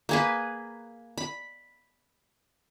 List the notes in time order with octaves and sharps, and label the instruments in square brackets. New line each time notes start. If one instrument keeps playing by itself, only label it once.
[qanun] A#3 G#4 B4
B5